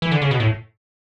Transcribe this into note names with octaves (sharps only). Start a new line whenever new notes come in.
E3
D3
C#3
B2
A2